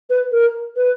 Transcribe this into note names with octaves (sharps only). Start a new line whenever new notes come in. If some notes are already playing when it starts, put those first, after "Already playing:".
B4
A#4
B4